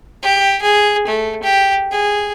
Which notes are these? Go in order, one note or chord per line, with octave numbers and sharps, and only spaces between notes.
G4
G#4
A3
G4
G#4